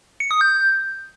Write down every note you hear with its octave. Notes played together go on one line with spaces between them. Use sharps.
C#7
D#6
G6